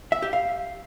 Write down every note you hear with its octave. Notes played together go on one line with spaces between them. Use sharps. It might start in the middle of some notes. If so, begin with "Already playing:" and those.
E5
G4
F5